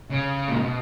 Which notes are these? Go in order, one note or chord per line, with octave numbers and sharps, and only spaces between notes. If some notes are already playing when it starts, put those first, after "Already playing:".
C#3
A#2
B2